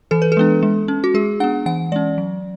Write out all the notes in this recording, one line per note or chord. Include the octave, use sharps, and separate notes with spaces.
E3 A4
B4
A4
G#3 B3 D4
G#3
C#4
F#4
G#3 G#4
B3 D4 F#5
E3 F#5
G#3 C#4 D5
F#3